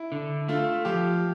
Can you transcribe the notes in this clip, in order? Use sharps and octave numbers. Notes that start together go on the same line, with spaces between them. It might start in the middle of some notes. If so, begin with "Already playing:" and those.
Already playing: E4
D3
A3 F4
F3 G4